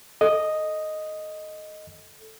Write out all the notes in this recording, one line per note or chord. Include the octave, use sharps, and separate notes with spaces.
A4 D#5